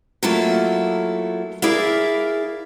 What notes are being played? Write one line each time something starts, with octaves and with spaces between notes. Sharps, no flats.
F#3 A3 A#3 E4 F4 E5
E4 G#4 A#4 D5 E5 F5